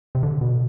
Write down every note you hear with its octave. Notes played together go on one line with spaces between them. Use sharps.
C3
D3
B2